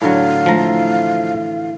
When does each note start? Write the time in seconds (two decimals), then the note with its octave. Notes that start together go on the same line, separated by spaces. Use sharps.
0.02 A2 D3 F#3 F5
0.46 E3 F3 A3 A#5